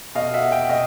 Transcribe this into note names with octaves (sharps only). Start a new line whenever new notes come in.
B2 D#5 F5
E5 F#5
F5 G5
B2 D#5 F5